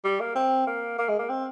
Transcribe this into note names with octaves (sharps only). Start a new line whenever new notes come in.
G3
A#3
C4
A#3
A#3
G#3
A#3
C4